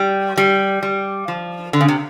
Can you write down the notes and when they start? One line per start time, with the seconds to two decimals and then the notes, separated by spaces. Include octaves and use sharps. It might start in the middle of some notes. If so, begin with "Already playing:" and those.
Already playing: G3
0.37 G3
0.83 G3
1.28 F3
1.73 D3
1.81 C#3
1.88 C3